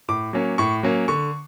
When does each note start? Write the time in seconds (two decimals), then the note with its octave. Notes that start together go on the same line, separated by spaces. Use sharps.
0.09 A2 D6
0.33 F#3 A#3 C#4
0.58 A2 C#6
0.83 F#3 A#3 C#4
1.08 D3 C#6